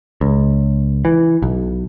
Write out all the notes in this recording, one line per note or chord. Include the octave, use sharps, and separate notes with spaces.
C#2
E3
B1